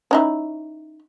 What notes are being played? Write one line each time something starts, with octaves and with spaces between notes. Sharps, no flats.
C#4 D#4 E4